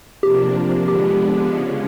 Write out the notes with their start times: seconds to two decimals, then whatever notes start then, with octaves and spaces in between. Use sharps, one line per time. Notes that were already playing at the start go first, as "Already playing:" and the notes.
0.23 C3 F3 A#3 D4 G4
0.88 D3 F3 G#3 B3 D4 G4
1.53 C#3 F3 G#3 C#4